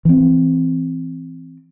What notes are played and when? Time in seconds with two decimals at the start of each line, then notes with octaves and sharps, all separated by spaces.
0.05 E3 C4